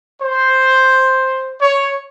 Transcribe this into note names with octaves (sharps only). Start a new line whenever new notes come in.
C5
C#5